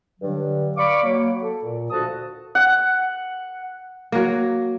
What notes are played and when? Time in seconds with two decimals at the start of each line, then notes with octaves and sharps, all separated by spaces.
0.20 G2 D3 F#3
0.77 D5 F5 B5 C#6 D6
1.02 F#3 A#3
1.41 A4
1.62 A#2
1.91 D2 F3 F#4 A4 A5 D#6
2.55 F#5
4.12 F#3 A#3